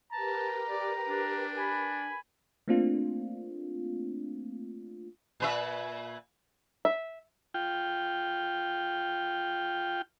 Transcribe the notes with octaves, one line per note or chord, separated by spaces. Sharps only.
G4 A#4 B4 A5 A#5
D5
D4
G#5 B5
A3 A#3 C4 D4 F4
A#2 B4 E5
E5
F4 G5